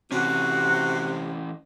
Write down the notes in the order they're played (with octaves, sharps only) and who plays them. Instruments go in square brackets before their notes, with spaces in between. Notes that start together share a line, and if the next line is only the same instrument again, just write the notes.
[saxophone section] C3 [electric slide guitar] E3 C#4 [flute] F#4